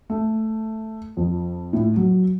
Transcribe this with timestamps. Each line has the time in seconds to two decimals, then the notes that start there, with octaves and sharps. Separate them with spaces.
0.10 A3
1.17 F2
1.73 A2
1.96 F#3